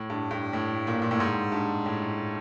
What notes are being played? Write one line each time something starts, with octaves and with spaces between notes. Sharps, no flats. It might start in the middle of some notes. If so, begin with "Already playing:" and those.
Already playing: A2
G2
G2
A2
A#2
A#2
A2
G#2
G2
A2